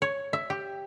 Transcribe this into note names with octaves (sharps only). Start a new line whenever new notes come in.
C#5
E5
G4